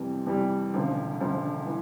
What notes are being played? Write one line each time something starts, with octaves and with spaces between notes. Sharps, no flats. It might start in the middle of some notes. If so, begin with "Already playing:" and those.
Already playing: F2 C3 E3 G3
F2 C3 E3 G3
E1 D2 C#3 F3
E1 D2 C#3 F3
E3